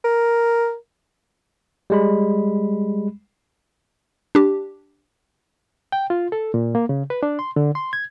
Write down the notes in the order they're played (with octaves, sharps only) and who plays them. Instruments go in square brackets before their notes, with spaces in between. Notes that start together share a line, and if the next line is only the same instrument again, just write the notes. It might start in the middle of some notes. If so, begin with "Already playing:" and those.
[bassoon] A#4
[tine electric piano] G3 G#3 B5
[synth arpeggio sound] D4 G4
[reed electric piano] G5
F4
A4
A#2
A#3
C#3
B4
D4
C6
D3
C6
G#6